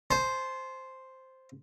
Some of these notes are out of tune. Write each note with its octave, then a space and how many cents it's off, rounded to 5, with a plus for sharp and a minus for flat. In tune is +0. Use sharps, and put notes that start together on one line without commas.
C5 +0 A5 -35